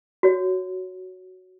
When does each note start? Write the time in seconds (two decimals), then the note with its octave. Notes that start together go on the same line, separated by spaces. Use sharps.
0.23 F#4 C#5